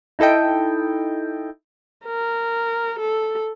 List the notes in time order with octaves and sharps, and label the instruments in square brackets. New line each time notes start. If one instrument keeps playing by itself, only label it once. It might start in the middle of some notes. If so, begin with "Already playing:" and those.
[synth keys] D#4 E4 A4 D#5 G5
[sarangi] A#4
A4